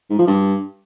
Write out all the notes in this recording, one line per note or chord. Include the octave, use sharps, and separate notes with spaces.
G#2
F3
G2